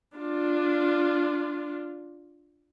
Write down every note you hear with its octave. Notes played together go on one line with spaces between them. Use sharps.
D4 F4